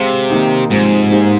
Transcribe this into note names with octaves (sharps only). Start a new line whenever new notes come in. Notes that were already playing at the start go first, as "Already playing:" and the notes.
Already playing: C3 G#3 C4 G4 C5 F5
D#3 A#3 D#4
G#2 C3 F3 G#3 C4
A#3 D#4 G4 C5